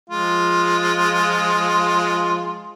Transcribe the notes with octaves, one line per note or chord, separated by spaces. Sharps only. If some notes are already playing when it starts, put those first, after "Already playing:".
F3 G#3 F4